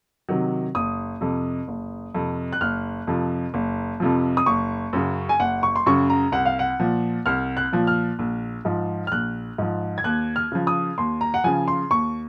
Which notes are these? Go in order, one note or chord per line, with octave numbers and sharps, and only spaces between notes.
C3 D#3 F#3
F#1 D#6
F2 C3
F#1
F2 C3
F#6
F#1 F6
F2 C3 F3
F#1
F2 C3 F3
D#6
F#1 C#6
F#2 C#3
G#5
F#1 F#5
C#6
C6
F#2 C#3 C#6
A#5
C2 F#5
F5
F#5
A#2 F3
C2 F6
F#6
A#2 F3
F6
A#1
G#2 F3
F6
A#1 F#6
G#2 F3
G#6
D#2 F#6
F6
C#3 F3
D#6
D#2 C6
A#5
F#5
C#3 F3 G#5
C6
D#2 C#6